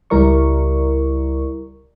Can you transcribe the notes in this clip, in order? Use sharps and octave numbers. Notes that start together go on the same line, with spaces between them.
C#2 G3 E4 A#4 D5 C#6